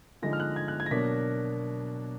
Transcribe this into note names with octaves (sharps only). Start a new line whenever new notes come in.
D3 F3 G#3 D#4 A#6
F6
F#6
G#6
F#6
G#6
A#6
B2 F#3 A#3 D4 B6